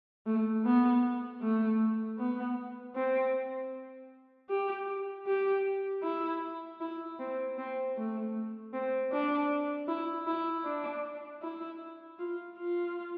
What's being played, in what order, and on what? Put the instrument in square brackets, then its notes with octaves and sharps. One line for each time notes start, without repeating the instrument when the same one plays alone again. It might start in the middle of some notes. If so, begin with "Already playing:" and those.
[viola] A3
B3
A3
B3
C4
G4
G4
E4
E4
C4
C4
A3
C4
D4
E4
E4
D4
E4
F4
F4